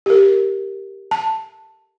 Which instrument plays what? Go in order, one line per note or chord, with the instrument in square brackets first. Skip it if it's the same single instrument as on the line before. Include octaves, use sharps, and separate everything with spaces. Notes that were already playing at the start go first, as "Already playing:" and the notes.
[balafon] G4 A#4
A5